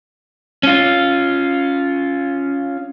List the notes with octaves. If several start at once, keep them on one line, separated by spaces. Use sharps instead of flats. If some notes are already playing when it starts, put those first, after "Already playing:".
C#4 F4